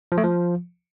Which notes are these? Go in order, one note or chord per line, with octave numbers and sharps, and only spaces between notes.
F3
A3
F3